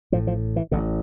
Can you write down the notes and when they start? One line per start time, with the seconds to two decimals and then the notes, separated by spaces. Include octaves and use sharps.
0.12 A1 A2 F3
0.27 F3
0.56 E3
0.71 A1 A2 D3